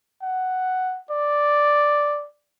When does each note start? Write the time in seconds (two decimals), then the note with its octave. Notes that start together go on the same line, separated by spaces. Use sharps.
0.22 F#5
1.11 D5